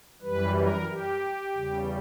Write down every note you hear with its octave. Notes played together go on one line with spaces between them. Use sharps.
F#2 E3 G3 B4
A#4
G4
E2 C#3 G3